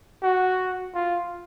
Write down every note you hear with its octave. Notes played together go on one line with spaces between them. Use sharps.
F#4
F4